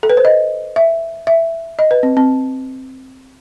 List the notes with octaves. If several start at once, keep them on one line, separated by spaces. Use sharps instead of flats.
A4
B4
C5
D#5
E5
E5
D#5
B4
C4
C4